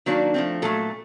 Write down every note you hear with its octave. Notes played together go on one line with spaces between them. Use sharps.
D#3 F#3 A#3 D4
F3 A3 C4
A#2 F#3 A3 A4